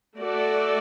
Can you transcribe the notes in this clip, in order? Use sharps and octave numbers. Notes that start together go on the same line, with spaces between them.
A3 F#4 A4 D5